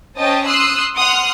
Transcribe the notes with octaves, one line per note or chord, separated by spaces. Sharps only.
C#4 C5 D#5 G5 A5 D#6
C6 D#6 E6 F#6 C7
F#5 C6 D#6 F6 F#6